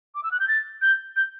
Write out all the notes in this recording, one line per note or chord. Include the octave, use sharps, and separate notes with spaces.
D6
E6
F#6
G6
A6
G6
G6